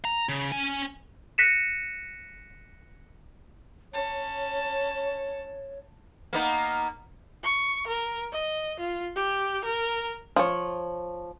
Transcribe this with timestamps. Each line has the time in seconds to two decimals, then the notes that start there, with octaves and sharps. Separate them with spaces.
0.05 A#5
0.29 C#3
0.52 C#4 G#5
1.38 F#6 A#6 B6 C#7 D#7 E7
3.93 C#4 C#5 A5
6.33 A#3 B3 D#4
7.43 C#6
7.87 A#4
8.32 D#5
8.80 F4
9.16 G4
9.64 A#4
10.36 F3 C#5